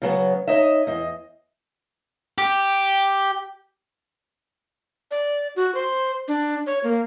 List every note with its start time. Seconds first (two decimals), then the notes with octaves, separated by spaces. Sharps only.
0.02 C#3 F#3 B3
0.48 D#4 C#5 D#5 E5
0.87 E2 D#5
2.38 G4
5.11 D5
5.56 F#4
5.75 C5
6.28 D4
6.67 C#5
6.84 A#3